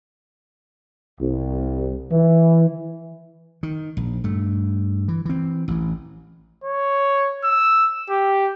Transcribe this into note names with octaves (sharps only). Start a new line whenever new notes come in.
C2
E3
D#3
A#1
G2 A3
E3
E3 C4
A1 E3
C#5
E6
G4